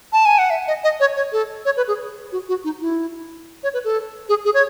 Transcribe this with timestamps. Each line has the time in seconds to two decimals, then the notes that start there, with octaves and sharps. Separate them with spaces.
0.13 A5
0.26 G#5
0.38 F#5
0.50 E5
0.68 D#5
0.84 D#5
1.00 C#5
1.17 C#5
1.32 A4
1.65 C#5
1.77 B4
1.88 G#4
2.32 F#4
2.49 F#4
2.64 D#4
2.81 E4
3.63 C#5
3.74 B4
3.84 A4
4.29 G#4
4.45 G#4
4.54 C#5